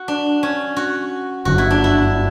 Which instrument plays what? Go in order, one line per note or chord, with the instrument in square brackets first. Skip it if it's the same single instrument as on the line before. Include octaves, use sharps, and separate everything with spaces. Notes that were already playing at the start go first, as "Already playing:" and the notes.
Already playing: [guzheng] F#4
D4
C#4
F#4
[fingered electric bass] G1 F#2 D3 [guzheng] F#4
[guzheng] E4
D4
E4